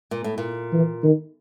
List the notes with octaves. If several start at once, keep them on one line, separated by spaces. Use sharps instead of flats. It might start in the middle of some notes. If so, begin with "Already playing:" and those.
A#2
A2
A#2
E3
D#3